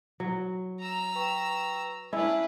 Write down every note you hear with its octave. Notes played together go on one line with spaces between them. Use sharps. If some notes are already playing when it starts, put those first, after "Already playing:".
F#3
A#5 E6
B4 G5 C#6
C#4 D4 E4 B4 E5